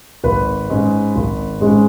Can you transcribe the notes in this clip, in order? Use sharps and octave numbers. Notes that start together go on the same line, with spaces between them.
G#1 B4
G#2 G#3 C#4
G#1
G#2 G#3 C#4